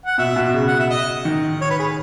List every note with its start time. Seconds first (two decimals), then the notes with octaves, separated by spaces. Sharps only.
0.06 F#5
0.18 B2 E5
0.36 B2
0.54 C#3
0.67 F#5
0.79 E5
0.90 D#5
1.25 D#3
1.61 C#5
1.70 B4
1.79 G#4